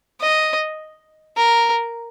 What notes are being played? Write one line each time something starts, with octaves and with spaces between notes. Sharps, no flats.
D#5
A#4